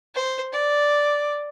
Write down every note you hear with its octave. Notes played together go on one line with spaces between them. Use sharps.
C5
D5